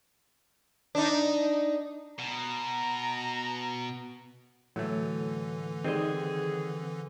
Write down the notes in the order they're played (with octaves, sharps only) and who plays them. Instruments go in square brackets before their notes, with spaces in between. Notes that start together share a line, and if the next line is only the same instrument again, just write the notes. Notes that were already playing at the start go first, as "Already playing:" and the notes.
[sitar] D4 D#4
[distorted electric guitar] B2 [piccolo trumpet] A#5
[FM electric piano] A2 [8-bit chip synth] D3 E3 [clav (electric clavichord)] F#3 A3
[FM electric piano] D#3 G3 [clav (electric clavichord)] C4 D#5 [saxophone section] G#4